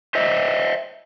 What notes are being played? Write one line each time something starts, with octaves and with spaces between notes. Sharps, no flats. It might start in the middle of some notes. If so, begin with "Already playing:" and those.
C5 D#5 E5